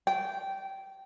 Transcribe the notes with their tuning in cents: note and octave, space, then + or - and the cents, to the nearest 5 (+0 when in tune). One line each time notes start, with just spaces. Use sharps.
G5 -15